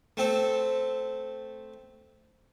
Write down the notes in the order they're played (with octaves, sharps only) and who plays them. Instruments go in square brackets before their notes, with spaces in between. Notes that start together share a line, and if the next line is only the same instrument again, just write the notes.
[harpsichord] A3 C4 A4